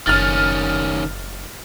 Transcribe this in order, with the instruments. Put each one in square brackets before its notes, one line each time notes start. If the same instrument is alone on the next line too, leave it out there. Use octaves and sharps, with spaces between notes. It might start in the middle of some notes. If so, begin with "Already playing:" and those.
[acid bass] F#1 [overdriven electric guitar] D#3 C#4 [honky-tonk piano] F6 A6